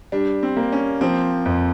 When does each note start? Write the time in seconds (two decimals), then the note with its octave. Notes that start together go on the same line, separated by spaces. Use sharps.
0.12 G3 D4
0.43 C4
0.57 A#3
0.72 C#4
1.01 F3 C4
1.46 F2